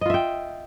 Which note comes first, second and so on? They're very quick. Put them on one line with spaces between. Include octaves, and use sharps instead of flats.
D#5 F4 E5 G5